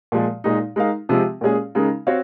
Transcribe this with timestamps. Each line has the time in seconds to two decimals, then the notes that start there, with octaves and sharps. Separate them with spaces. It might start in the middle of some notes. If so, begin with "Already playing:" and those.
0.12 A#2 F3 G#3
0.44 A#2 G#3 D#4
0.76 G#3 D#4 A#4 F5
1.09 C3 F3 G#3 C4
1.41 A#2 G#3 C#4 G#4
1.75 C#3 G#3 D#4 A#4
2.07 C4 F#4 C#5 F5